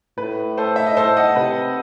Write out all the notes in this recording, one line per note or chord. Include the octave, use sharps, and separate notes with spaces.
A2 B4
A4 C5
E5
D#5
A2 A4 C5
D#5 F#5
C3 B4